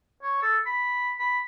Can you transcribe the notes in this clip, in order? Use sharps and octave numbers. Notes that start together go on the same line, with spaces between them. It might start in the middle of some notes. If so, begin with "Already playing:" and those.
C#5
A4
B5
B5